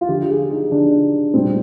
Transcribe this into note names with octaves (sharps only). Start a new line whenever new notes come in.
F4
D3 F3 G4
G#4
D#4
D3 F3 D4
A#2 G3 C4